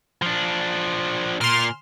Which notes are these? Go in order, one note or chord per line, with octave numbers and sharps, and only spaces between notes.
F3 D4
A#2 C6 F6